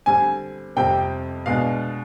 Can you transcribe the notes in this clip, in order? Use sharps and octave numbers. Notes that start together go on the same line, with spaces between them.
D3 G3 C4 G#5
F2 C3 G3 C4 G5
B2 G#3 D4 F5